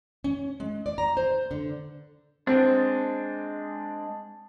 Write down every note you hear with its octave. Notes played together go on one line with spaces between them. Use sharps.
C#4
G#3
D5
A#5
C5
D3
G#3 C4 D4